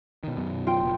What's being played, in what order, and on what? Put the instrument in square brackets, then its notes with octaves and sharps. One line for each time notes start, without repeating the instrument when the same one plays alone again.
[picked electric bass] B2 D#3
F#2 B2 D#3
[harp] F4 G5
[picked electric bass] F#1 B2